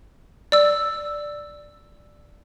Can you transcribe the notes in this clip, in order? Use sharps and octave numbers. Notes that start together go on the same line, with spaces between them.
D5 E6